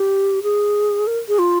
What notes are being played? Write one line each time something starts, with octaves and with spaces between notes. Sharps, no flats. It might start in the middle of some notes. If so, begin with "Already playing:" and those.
Already playing: G4
G#4
A#4
G#4
F4